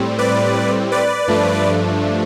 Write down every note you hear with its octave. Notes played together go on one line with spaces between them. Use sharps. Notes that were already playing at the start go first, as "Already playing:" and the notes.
Already playing: A2 G3 C4
B4 D5
B4 D5
G2 F3 A3 D4